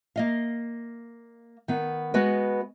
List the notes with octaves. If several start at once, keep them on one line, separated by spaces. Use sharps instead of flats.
A#3 D#5 F5
D#3 B3
G#3 B3 F#4 B4 D#5